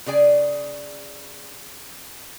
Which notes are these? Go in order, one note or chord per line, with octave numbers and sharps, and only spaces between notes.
C#3 G#4 D5 G#5